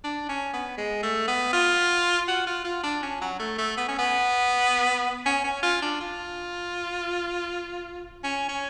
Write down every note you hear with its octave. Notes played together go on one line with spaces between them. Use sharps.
D4
C#4
B3
G#3
A3
B3
F4
F#4
F4
F4
D4
C#4
F#3
A3
A3
B3
C#4
B3
C#4
C#4
F4
D4
F4
C#4
C#4